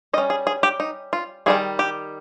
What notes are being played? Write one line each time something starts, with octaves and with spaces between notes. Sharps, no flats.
G3 C#4 D#5
G#4
G#4
G4
D#4
F4
D#3 G3 A#3 G#4
G4